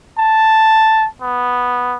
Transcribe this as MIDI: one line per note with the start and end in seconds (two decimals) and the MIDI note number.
0.19 1.08 81
1.22 1.97 59